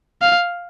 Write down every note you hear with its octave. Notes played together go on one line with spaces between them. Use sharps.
F5